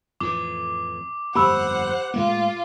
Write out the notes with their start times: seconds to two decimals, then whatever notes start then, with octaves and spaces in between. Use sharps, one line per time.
0.20 F2 A2 E3 D6
1.35 G1 F2 A#3 G4 C5 F#5 B5 E6
2.14 A2 G#3 A#3 F4